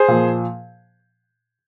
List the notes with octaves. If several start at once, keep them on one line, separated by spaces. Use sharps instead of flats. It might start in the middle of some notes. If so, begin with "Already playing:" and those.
Already playing: G#4 C5
A#2 F3